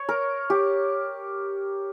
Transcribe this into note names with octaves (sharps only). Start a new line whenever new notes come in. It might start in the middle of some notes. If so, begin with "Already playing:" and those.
Already playing: C#5
A#4
G4